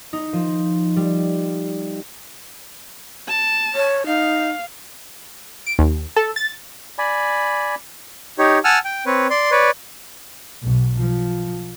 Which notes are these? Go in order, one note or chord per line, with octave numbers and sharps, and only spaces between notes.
D#4
F3
G3
A5
C#5
D#4 F5
D7
D#2
A4
A6
D5 G#5 B5
D#4 G4 C#5
F#5 G#5 A5 E6 F6
G5
C4 B4 C#5
D5 C6
B4 C#5 D5
B1 B2
F3